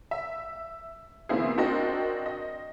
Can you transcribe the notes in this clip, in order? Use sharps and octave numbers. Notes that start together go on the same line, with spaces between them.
E5
B2 E3 A#3 C4 E4 G#4
C4 D4 F#4 A#4 D#5 G5
D#5